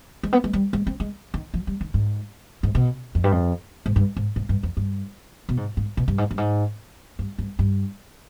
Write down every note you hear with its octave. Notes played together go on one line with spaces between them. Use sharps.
G#3
B3
G#3
G3
G#3
C4
G#3
D#3
F3
G3
D#3
G#2
G#2
B2
F2
G2
F2
G#2
G2
G#2
G#2
G2
F2
G2
B2
G#2
G#2
B2
G2
G#2
G2
G#2
G2
G2
G2